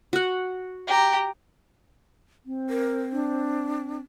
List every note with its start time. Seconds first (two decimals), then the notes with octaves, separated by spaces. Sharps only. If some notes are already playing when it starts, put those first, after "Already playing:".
0.13 F#4 F#5
0.87 G4 A#5
2.46 C4
2.70 A#4
3.12 D4